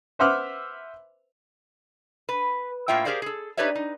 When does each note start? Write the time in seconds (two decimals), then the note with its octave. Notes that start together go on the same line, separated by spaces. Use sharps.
0.19 B4 C5 E5 F#5 D6 F6
2.29 B4
2.88 A2 A#3 F4 E5 G5
3.05 G4 G#4 A#4 C5 D5 F5
3.22 G#4 A4
3.57 D#4 G4 B4 C#5 D5 E5
3.75 D#4